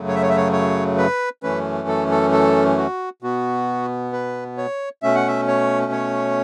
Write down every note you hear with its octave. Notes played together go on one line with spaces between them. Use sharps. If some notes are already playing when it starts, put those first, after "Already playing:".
Already playing: F#2 C#3 F#3 A3
C#5
E5
C#5
E5
C#5
C#5
B4
F#2 E3 A3 C#4 B4
A4
A4
A4
F#4
B2 B3 F#4
B4
C#5
B2 A3 C#4 E5
F#5
E5
C#5
C#5